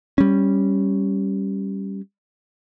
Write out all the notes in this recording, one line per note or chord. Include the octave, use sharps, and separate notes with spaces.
G3 C#4